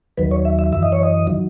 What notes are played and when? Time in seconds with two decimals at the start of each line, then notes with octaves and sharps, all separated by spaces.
0.17 D#2 D#3 F#3 B4
0.31 C#5
0.45 E5
0.59 E5
0.72 F#2 E3 E5
0.83 D#5
0.92 C#5
1.03 D#5
1.27 D#3 F#3